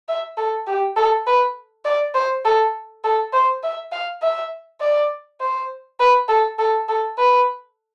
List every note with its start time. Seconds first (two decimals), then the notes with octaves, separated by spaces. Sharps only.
0.08 E5
0.37 A4
0.67 G4
0.96 A4
1.27 B4
1.85 D5
2.15 C5
2.45 A4
3.04 A4
3.33 C5
3.63 E5
3.92 F5
4.22 E5
4.81 D5
5.41 C5
6.00 B4
6.28 A4
6.59 A4
6.88 A4
7.18 B4